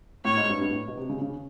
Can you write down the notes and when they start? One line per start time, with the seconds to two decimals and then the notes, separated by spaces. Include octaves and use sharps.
0.24 A2 C#5
0.37 G#2
0.49 G2
0.61 G2
0.71 A2
0.88 B2
0.97 C3
1.09 C#3
1.21 C#3